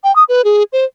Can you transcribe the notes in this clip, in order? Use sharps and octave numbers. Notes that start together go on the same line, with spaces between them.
G5
D#6
B4
G#4
C5